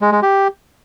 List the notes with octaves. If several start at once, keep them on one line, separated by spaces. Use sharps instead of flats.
G#3
G#3
G4